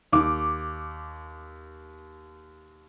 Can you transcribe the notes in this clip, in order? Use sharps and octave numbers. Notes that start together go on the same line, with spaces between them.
D#2 D6